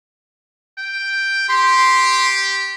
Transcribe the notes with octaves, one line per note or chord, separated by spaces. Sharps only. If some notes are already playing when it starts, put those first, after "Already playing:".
G5
G4 C6